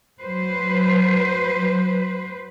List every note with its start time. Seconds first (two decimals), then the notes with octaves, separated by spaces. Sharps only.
0.20 F#3 B4 C5